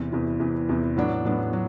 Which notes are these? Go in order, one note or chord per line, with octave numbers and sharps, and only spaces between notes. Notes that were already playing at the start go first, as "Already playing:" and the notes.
Already playing: E2 C3 E3
E2 C3 E3
E2 C3 E3
E2 C3 E3
A2 F#3 B3 D4
A2 F#3 B3 D4
F#3